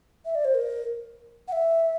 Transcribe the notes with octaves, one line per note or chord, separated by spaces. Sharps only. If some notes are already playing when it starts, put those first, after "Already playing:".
E5
D5
C5
A#4
F#5
E5